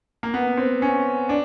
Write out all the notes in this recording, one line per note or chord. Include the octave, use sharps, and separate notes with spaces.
A#3
B3
C4
C#4
D4